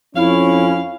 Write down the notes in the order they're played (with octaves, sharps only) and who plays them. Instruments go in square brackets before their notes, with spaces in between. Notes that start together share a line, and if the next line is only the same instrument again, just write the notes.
[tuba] F2 [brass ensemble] C#4 [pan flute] E4 [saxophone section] C#5 F5